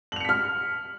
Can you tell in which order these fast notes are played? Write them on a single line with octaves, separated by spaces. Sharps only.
F#7 F7 C#7 B6 F6